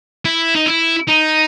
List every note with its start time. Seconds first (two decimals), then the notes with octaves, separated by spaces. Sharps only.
0.25 E4
0.55 D#4
0.66 E4
1.08 D#4